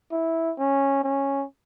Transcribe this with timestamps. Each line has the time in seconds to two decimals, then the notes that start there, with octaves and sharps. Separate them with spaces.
0.12 E4
0.58 C#4
1.04 C#4